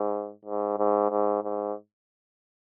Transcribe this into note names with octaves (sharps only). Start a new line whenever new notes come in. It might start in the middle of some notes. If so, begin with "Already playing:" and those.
Already playing: G#2
G#2
G#2
G#2
G#2